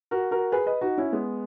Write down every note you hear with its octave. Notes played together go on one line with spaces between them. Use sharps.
F#4 A#4
F#4 A#4
G#4 B4
B4 D#5
D#4 F#4
C#4 E4
G#3 B3